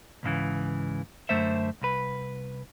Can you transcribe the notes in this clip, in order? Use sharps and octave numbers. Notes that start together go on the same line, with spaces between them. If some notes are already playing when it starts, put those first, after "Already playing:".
C#2 G#2 C#3 E3
F#2 D3 A3 C5 E5
C2 B4